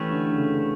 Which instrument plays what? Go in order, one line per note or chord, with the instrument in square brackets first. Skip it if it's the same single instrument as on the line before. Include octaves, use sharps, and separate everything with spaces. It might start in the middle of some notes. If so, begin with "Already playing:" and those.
Already playing: [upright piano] E3 [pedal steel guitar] A3 C#4 G4 B4
[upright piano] D3
D3
C#3
C#3